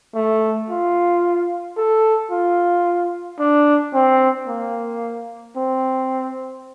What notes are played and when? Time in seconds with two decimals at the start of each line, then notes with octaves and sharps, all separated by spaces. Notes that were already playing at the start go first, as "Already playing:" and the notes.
0.15 A3
0.70 F4
1.77 A4
2.31 F4
3.39 D4
3.94 C4
4.48 A#3
5.56 C4